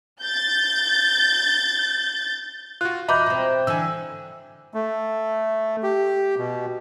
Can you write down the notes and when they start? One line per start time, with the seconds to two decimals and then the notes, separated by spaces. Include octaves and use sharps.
0.22 G6 A6
2.81 F4 F#4 F#6
3.08 E2 D#5 E5 A#5 B5 D6 G6
3.26 B2 C4
3.67 D3 E3 G#5 E6
4.74 A3
5.83 G4
6.38 B2